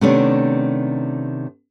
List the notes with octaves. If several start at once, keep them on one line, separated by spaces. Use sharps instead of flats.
C3 D#3 A3 B3 C#4 D4